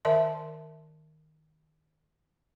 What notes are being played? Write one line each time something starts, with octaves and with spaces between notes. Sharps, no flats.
D#3 A#4 D5 E5 A5 C6